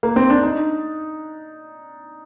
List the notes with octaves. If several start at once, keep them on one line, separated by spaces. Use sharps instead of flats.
A#3
C4
D4
D#4